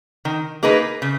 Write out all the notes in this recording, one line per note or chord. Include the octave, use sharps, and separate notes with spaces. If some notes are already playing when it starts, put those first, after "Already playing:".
D#3
A#3 D#4 G#4 B4
C#3